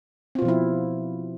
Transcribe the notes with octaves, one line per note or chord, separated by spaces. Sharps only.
B2 F3 C4 E4 F4